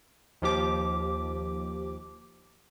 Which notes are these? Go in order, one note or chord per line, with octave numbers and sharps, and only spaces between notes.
D#2 F3 G4 D6